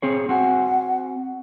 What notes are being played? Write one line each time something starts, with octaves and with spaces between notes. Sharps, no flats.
C4 G#4 C#5
C4 F#4 F#5 G#5